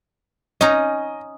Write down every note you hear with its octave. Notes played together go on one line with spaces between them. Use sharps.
C#4 D#4 D#5 A#5